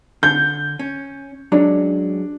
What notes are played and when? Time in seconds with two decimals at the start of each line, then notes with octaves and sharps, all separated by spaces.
0.23 D3 G6
0.79 C#4
1.52 F#3 G#3 C#4 D4